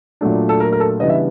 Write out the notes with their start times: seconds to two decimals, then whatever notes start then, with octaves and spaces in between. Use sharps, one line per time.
0.21 A#2 F#3 A3 D4
0.49 A4
0.60 A#4
0.72 A#4
0.80 A4
1.00 C#3 E3 G3 B3 D4 D#5
1.10 E5